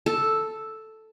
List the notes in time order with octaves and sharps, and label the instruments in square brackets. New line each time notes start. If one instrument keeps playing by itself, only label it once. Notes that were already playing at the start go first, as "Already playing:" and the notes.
[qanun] A4